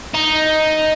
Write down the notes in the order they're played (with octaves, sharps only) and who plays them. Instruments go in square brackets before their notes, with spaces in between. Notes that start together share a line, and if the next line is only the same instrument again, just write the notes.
[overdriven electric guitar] D#4